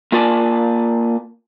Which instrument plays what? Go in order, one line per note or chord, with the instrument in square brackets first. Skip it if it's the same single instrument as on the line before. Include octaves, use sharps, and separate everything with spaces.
[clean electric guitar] A#3 F4 A#4 D5 G#5 A5